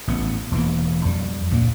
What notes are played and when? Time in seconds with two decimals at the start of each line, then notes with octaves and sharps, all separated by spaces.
0.08 A1 B3
0.52 E1 E3 A#3
1.05 F2 G3
1.50 D2 A#2 A#3